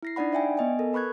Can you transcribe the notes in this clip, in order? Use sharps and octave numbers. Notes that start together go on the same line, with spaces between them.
E4 A#6 C7
D4 D#4 D5 F#5 B5
D5 E5 G5 G#5
B3 D#5 G#5
A4 A#4
B4 B5 C#6 F#6 G#6